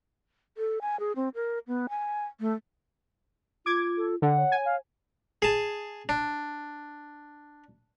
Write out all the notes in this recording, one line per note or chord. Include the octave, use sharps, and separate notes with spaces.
A4
G#5
G#4
C4
A#4
B3
G#5
A3
F4 D6 G#6
A4
D3 F#5
C#5
G#5
F5
G#4 A5
D4